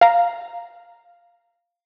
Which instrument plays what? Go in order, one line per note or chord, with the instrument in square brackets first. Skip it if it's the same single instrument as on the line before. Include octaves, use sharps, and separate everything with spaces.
[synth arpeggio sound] F5 A#5